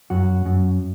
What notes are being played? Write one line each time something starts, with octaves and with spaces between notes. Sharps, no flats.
F#2 F#4
F#2